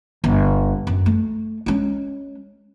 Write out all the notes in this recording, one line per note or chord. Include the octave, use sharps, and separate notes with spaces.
G1
F#2
A3
G#3 C#4